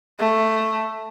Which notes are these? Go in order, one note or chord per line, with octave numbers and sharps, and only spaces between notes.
A3